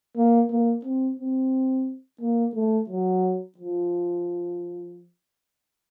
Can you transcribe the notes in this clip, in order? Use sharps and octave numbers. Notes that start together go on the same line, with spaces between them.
A#3
A#3
C4
C4
A#3
A3
F#3
F3